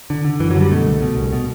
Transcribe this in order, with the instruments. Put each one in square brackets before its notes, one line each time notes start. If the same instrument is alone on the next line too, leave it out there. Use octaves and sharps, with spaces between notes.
[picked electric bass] D3
D3
F#2 E3
F#3
D3 G3
B2 A3
C2
B2
C2
B2